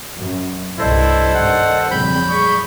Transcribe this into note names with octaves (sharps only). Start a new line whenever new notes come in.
F#2
C2 G2 E4 A4 C5 D5 D#5
G2 D#3 F#5
F2 A#2 C#3 F#3 G3 C4 B5 G6
G3 G#4 C#6